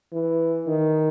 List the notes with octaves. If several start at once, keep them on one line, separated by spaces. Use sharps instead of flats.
E3
D#3